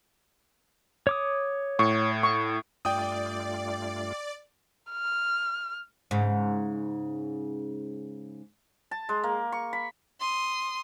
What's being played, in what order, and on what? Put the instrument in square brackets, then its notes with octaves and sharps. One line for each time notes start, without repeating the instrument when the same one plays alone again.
[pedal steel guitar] C#5 D6 D#6
[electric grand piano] A2 [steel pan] C#6
[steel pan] C#6
[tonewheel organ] G2 A3 F4 [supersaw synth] D5 [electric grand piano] G5 D#6
[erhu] F6
[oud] G#2 C#3
[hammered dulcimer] A5
G#3
A#3
C#6
B5
[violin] C6 D#6